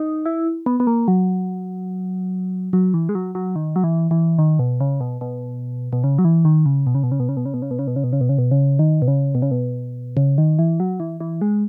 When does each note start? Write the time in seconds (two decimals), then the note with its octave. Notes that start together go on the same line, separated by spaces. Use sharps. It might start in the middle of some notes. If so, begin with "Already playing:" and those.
Already playing: D#4
0.26 E4
0.66 B3
0.80 B3
0.87 A#3
1.08 F#3
2.73 F#3
2.94 E3
3.09 G#3
3.15 F#3
3.35 F#3
3.56 D#3
3.76 F#3
3.84 E3
4.11 E3
4.39 D#3
4.59 B2
4.81 C#3
5.01 B2
5.21 B2
5.93 B2
6.04 C#3
6.19 F#3
6.25 E3
6.45 D#3
6.66 C#3
6.87 B2
6.95 C#3
7.03 B2
7.12 C#3
7.20 B2
7.29 C#3
7.37 B2
7.45 C#3
7.54 B2
7.62 C#3
7.71 B2
7.79 C#3
7.87 B2
7.96 C#3
8.04 B2
8.13 C#3
8.21 B2
8.29 C#3
8.38 B2
8.51 C#3
8.79 D#3
9.02 B2
9.08 C#3
9.35 B2
9.42 C#3
9.51 B2
10.17 C#3
10.38 D#3
10.59 E3
10.80 F#3
11.00 E3
11.21 E3
11.41 G#3